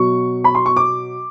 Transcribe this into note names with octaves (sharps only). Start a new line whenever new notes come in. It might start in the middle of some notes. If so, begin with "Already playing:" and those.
Already playing: B2 F#3 C#6
B5
C6
C#6
D6